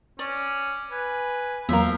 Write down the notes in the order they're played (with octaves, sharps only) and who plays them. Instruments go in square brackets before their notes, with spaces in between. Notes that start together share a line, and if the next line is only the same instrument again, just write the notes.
[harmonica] C#4 [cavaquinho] D5
[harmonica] B4 G#5
[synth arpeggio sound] E2 F#3 A#3 [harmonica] F3 F4 [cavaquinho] A#4 E5